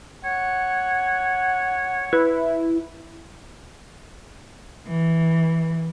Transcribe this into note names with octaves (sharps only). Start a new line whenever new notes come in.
C#5 F#5
E4 B4
E3